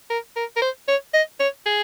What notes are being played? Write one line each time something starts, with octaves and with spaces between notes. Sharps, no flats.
A#4
A#4
A#4
C5
C#5
D#5
C#5
G#4